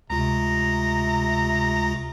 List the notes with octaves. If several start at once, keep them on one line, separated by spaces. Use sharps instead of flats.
D2 C3 G#3 F4 A#5